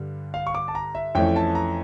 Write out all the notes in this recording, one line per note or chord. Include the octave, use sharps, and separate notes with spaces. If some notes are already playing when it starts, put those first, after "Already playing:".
Already playing: G2 D3 G3
F5
C#6
D6
A5
A#5
E5
F2 E3 A3 C#4 E4 G5
A5
A#5